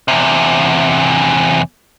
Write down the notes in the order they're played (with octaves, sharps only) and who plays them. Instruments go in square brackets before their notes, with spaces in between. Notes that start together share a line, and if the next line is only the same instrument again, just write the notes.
[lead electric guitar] E2 C3